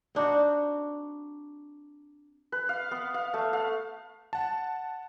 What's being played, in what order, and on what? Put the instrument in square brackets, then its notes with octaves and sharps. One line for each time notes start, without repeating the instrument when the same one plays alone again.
[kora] C4 D4 D#4 F#4
[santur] B4
F5
B3
F5
A3
F5
[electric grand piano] F#5 A5